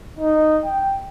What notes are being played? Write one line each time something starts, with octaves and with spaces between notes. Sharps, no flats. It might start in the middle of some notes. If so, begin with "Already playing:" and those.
D#4
G5